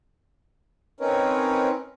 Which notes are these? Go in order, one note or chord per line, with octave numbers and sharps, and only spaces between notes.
C4 C#4 D#4 A#4 B4 C#5